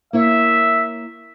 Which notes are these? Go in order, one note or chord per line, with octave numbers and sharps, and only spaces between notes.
A#3 E4 C#5 E5